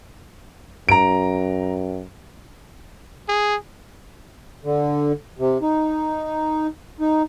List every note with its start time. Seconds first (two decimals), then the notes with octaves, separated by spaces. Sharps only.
0.89 F#2 A#5 D7
3.28 G#4
4.64 D3
5.39 C3
5.62 D#4
7.00 D#4